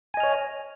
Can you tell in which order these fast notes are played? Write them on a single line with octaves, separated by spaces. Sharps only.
G#5 D#5 F6 C#5